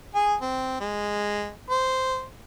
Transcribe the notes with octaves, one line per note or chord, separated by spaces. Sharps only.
G#4 G#5
C4
G#3
C5